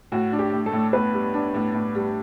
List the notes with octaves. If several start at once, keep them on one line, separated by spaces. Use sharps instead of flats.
A2 F#4
D4
G4
A2
A3 A4
A2
A2 B3 B4
G3
D4
A2
A2
G3